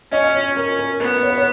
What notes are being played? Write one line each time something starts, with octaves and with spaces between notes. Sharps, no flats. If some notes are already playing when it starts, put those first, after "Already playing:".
C#4 D#5
D#5
C#5
C#4 A#4
A#4
B3 A#4
C#5
B4
C#5